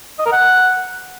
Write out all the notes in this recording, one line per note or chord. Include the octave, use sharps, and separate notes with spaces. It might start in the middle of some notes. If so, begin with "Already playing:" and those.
D#5
A#4
F#5